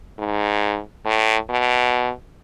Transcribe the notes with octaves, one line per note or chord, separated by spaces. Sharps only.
G#2
A2
B2